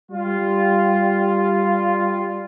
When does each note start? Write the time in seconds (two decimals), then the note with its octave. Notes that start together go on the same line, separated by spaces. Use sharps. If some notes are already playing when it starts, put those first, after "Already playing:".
0.11 G3 F4